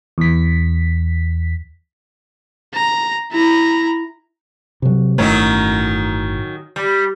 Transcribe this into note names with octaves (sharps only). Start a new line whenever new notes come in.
E2 B6
A#5
E4 A#5
C3 F#3
G1 A2 D#3 F#3 A3 C#4
G3